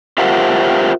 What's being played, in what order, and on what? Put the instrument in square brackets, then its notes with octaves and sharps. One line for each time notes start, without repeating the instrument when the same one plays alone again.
[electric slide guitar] F4 G4 A#4 C5 E5 F#5